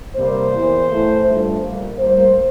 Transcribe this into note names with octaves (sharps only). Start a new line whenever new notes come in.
C3 G3 A#3 C5
E2 E3 A#3
A2 E3 A3
G2 F3 A3
A#2 G3 A#3
A2 G3 A#3 C5